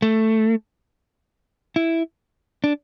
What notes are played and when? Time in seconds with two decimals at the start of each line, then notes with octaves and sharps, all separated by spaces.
0.02 A3
1.76 E4
2.64 D4